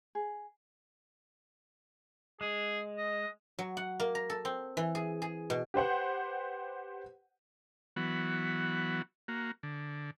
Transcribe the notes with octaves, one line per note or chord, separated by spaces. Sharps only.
G#4
G#3 G#4
D#5
F#3
F#5
A#3
A#5
A4
C4
E3
G#4
G#4
B2
G4 B4 C5 F#5
E3 F#3 B3 F#4
A#3 F#4
D3